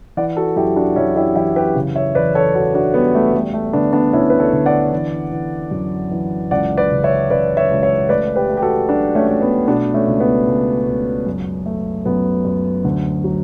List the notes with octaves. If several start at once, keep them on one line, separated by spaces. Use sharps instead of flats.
E3 D5 F#5
F#4 A4
F#2 E4 G4
D4 F#4
F#2 C#4 E4
E4 G4
E3 E4 G4
G4 B4
C#3
C#5 E5
E2 B4 D5
A4 C#5
E2 F#4 A4
D4 F#4
G3 B3
A3
G3 A3
A3
D3 B3 D4
B3 D4
D2 C#4 E4
B4
A4 C#5
D3
D5 F#5
E3
E3
F#2
E3
C#2 D5 F#5
B4 D5
C#3
C#5 E5
C#3 B4 D5
C#5 E5
C#2
C#5 E5
A3 B4 D5
G4 B4
A3
G4
F#4 A4
F#3 D4 F#4
A3 C#4
A3
B3
B2 B3 D4
A3 C#4
C#2
B3
C#2
C#2
F#2
A3
F#2 B3
F#2
D2
F#3